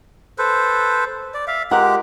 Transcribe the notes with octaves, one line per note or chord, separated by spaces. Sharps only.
A4 B4 C5
D5
E5 F5
G#3 F4 G4 A#4 F#5